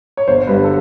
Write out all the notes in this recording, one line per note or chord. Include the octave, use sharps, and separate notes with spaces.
C#5
G1 C5
G2 D3 B4
A4